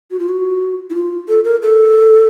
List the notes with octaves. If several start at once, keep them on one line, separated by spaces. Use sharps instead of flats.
F#4
F4
F#4
E4
F4
A4
A#4
A4